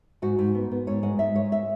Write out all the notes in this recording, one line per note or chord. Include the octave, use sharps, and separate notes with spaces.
G#2 F#4
G#2
B3
B3
G#2 C#5
G#3 F#5
G#2 E5
G#3 C#5
E5